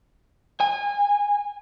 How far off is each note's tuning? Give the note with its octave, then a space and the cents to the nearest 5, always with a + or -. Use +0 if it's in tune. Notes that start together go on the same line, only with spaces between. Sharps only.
G#5 -30